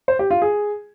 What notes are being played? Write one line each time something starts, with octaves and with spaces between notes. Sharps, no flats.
C5
G4
F4
G#4